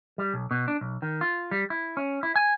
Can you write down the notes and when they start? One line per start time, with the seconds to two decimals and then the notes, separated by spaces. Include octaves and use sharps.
0.18 G3
0.34 B1
0.51 B2
0.68 D4
0.81 B1
1.02 D#3
1.21 F4
1.51 G3
1.70 E4
1.97 C#4
2.23 E4
2.36 G#5